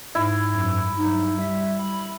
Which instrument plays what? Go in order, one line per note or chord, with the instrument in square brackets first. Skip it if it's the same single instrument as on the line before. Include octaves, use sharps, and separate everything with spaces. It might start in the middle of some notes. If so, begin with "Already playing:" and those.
[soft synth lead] G#2 [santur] E4
[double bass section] F#2
[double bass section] G2 F#3 [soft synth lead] D#4
[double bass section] G3 [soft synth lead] E5
[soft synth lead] B5